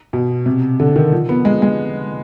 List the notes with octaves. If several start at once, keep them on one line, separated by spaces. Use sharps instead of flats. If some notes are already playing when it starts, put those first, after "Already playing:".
B2
C3
D3
D#3
F3
B3
G#3
G#3